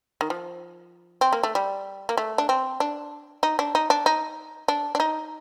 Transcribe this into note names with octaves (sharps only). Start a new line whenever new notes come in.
D#3
F3
C4
A#3
A3
G3
A#3
A3
D4
C4
D4
D#4
D4
D#4
D4
D#4
D4
D4
D#4